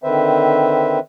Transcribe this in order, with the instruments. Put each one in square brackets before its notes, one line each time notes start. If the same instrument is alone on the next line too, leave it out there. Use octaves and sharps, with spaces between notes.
[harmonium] D3 D#3 C4 B4 C5 E5